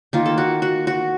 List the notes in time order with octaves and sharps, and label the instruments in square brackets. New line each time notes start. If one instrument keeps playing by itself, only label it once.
[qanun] D#3 A#3 F4
A4
F#4
F#4
F#4